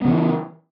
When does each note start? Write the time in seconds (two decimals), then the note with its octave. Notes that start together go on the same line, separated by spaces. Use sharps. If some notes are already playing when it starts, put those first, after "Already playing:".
0.02 B3
0.05 C#3
0.08 E3